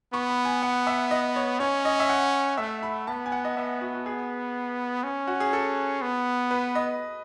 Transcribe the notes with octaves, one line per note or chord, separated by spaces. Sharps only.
B3 C#6
B5
G#5
F#5
E5
D#5
C#5
C#4 C#5
D#5
E5
F#5
A3 E5
B5
B3 A5
G#5
F#5
D#5
B3 E5
F#4
F#4
G#4
C#4
F#4
G#4
A4
B3
B4
D#5